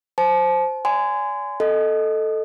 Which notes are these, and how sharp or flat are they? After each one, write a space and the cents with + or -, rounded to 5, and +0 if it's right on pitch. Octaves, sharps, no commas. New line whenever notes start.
C5 +0 A5 -35
D5 -45 G#5 +0 C6 -30
A4 +0 D#5 +0